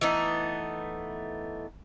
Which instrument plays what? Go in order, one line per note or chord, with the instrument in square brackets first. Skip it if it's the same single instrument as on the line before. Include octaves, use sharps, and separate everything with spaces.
[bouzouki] E3 A3 B3 D#4